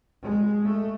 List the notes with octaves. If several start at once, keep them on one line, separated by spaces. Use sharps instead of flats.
G#3
A3